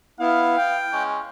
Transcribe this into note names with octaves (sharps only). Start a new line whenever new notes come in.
B3 E4 F5
G5
G#3 C#4